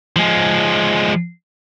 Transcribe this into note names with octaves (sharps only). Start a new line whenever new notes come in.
F3 G#3